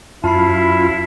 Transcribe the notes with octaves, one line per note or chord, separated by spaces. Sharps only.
F#2 E4 F4 A5 B5 C7